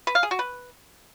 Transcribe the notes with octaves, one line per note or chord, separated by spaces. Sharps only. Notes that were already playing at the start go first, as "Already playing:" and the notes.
B4
F5
G#4
F#4
B4